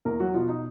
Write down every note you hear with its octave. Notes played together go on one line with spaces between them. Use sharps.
E2 A#3 A#4
F#3 F#4
B2 F3 F4
D#4